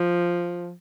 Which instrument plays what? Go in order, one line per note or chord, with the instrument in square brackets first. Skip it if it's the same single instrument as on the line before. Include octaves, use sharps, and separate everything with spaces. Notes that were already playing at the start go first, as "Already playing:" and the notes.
Already playing: [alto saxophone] F3